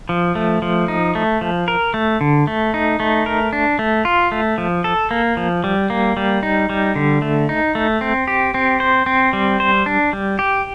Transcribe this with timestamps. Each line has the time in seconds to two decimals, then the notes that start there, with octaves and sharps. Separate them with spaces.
0.09 F3
0.35 A3
0.62 F3
0.88 D#4
1.15 A3
1.41 F3
1.68 A#4
1.94 A3
2.21 D3
2.47 A3
2.74 D#4
3.00 A3
3.26 A#4
3.53 D4
3.79 A3
4.05 F4
4.32 A3
4.58 F3
4.84 A4
5.11 A#3
5.37 F3
5.64 G3
5.90 A#3
6.17 G3
6.43 D#4
6.69 G3
6.96 D3
7.22 A3
7.49 D#4
7.75 A3
8.01 C4
8.28 G4
8.54 C4
8.80 C5
9.06 C4
9.33 G3
9.60 C5
9.86 D4
10.13 G3
10.39 G4